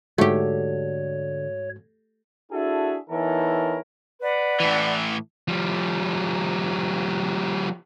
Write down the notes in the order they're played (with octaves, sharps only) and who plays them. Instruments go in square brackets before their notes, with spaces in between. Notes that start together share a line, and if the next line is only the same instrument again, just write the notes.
[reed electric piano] G#2 F#4 [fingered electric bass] D3 [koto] A3 G4 [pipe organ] C#5
[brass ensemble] D4 E4 F#4 G#4 A4 E5
E2 E3 D#4 A4 A#4 C#5
[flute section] B4 D5 F#5
[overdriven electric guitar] A2 E3
[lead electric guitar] F3 G3